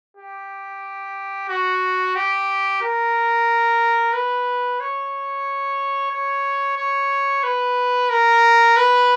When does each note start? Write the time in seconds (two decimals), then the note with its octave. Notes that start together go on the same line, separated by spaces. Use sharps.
0.17 G4
1.49 F#4
2.16 G4
2.82 A#4
4.13 B4
4.80 C#5
6.11 C#5
6.77 C#5
7.43 B4
8.10 A#4
8.77 B4